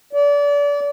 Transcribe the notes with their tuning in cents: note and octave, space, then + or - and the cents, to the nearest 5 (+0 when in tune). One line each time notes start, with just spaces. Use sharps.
D5 -30